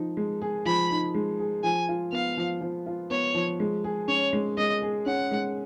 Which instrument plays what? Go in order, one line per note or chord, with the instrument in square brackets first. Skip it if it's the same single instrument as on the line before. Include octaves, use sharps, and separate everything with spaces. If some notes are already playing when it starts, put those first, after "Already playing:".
Already playing: [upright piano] F3 D#4
G#3
G#4
[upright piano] F3 [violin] B5
[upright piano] D#4
G#3
G#4
[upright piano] F3 [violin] G#5
[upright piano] F4
[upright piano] B3 [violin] F5
[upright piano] F3
F3
F4
[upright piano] B3 [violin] C#5
[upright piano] F3
G#3
G#4
[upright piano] C#4 [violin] C#5
[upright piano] G#3
[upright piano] G#3 [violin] D#5
[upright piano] G#4
[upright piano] C#4 [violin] F#5
[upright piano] G#3